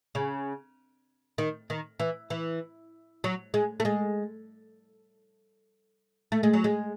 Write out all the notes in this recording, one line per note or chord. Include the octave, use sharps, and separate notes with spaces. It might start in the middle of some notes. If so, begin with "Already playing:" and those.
C#3
D#3
D#3
E3
E3
F#3
G#3
A3
G#3
A3
G#3
F#3
G#3